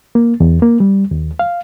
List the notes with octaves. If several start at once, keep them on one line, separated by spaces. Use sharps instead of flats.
A#3
E2
A#3
G3
D#2
F5